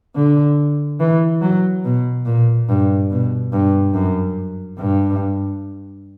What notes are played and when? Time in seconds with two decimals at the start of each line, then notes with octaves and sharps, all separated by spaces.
0.16 D3
1.00 E3
1.42 F#3
1.84 B2
2.26 A#2
2.69 G2
3.11 B2
3.52 G2
3.94 F#2
4.79 G2